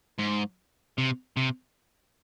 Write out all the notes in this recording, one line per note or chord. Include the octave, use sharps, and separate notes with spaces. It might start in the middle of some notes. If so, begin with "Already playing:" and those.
G#2
C3
C3